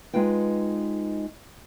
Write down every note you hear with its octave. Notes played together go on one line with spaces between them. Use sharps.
G#3 D#4 F4 B4 G5